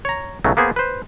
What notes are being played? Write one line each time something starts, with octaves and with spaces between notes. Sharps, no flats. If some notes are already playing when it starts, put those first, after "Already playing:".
C#5 A#5
B1 C#3 F#3 A3
A#3 B3 G#4 C5
B4 C5